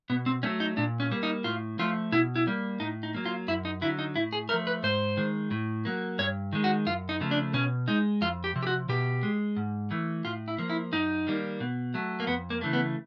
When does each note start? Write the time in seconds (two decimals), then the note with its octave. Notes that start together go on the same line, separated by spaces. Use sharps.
0.10 B2 B3
0.26 C4
0.43 F#3 A3 C#4
0.60 D#4
0.77 A#2 D4
1.00 C#4
1.11 G3 A#3
1.23 D#4
1.44 A2 F4
1.79 F3 A3 F4
2.12 B2 E4
2.36 E4
2.47 G3 A#3
2.80 A2 D#4
3.03 D#4
3.14 F#3 A#3
3.26 F4
3.48 F#2 E4
3.65 D#4
3.82 D3 F#3 E4
3.99 D#4
4.16 A2 E4
4.33 G#4
4.49 F3 A3 A#4
4.67 B4
4.83 G#2 C5
5.17 D#3 G#3
5.51 A2
5.85 F#3 A#3
6.19 G2 C#5
6.53 D#3 G#3
6.64 F#4
6.87 F#2 F4
7.09 D#4
7.20 C#3 F3 A3
7.31 D4
7.53 B2 C#4
7.88 G#3 D#4
8.21 F2 F4
8.44 G4
8.56 C3 F3
8.63 G4
8.67 F#4
8.89 B2 G4
9.23 G#3
9.56 G#2
9.91 E3 A3
10.25 A2 F4
10.48 E4
10.58 F3 A#3
10.70 E4
10.92 F#2 D#4
11.27 D#3 G3 A#3
11.60 B2
11.94 F#3 A3
12.20 A#3
12.27 F2 B3
12.50 A#3
12.61 C#3 E3 A3
12.73 B3